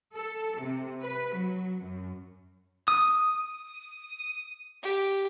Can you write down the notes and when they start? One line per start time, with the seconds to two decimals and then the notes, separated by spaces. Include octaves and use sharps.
0.16 A4
0.59 C3
1.04 B4
1.35 F#3
1.82 F#2
2.88 D#6
4.83 G4